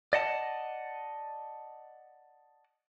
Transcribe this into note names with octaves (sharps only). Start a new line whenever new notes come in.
D5 D#5 F#5 A5